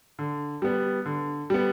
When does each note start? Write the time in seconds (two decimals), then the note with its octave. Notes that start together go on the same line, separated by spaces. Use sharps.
0.19 D3
0.62 G3 B3
1.06 D3
1.50 G3 B3